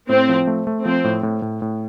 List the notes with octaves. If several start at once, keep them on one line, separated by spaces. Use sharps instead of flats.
A2 C4
F3
A3
A3
F3 C4
A2
A2
A2
A2